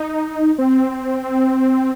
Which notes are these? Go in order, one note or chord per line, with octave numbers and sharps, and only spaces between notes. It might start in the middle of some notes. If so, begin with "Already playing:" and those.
Already playing: D#4
C4